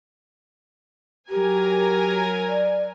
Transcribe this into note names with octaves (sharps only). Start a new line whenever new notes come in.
F#3 G4 A#4 G#5
D5